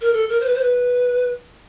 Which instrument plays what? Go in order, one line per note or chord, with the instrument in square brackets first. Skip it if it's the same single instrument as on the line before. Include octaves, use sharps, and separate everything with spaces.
[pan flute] A#4
A4
A#4
C5
B4
C5
B4